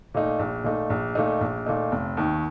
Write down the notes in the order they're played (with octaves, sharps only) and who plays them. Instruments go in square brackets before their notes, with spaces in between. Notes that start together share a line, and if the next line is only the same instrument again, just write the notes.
[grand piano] A#2 A3 D#4
A#1
A#2 A3 D#4
A#1
A#2 A3 D#4
A#1
A#2 A3 D#4
F1
D#2 D#3